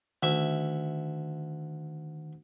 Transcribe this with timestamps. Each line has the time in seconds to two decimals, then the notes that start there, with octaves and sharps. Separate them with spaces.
0.23 D2 D#3 E5 C#6